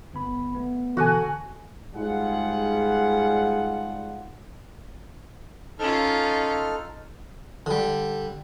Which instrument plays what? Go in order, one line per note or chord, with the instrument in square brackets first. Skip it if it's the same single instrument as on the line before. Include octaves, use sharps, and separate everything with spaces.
[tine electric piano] G1 B3 B5
A3 B3
[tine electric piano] B2 D3 E3 [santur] F#4 F#5 G#5 [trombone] A4
[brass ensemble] G#2 G3 F4 G#4 F#5
[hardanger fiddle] C#4 F4 [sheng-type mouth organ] D#4 A4 F6
[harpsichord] D3 G3